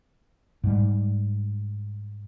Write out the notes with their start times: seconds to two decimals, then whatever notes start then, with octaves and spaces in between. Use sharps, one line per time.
0.64 G#2 G3